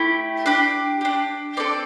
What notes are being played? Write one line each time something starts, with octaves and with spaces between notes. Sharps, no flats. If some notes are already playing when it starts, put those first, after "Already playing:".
Already playing: A3 E4 G4
D4 G4
D4 G4
C4 A4 D5